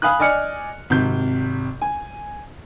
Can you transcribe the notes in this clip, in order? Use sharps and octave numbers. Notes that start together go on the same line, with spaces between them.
F5 G#5 B5 D#6 F#6
D5 D#5 G#5 F6 C#7
G#1 C3 G6
G#5